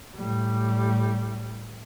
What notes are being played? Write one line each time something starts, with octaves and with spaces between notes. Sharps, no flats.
A2 G3